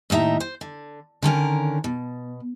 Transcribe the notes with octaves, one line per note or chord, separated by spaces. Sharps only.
D#2 A2 D#4 E5 A#5
C5
D3
D3 D#3 C#4 A#4
B2